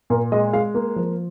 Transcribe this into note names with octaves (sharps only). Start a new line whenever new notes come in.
A#2 A#4
G#3 D#5
G#3 F5
A#3
F3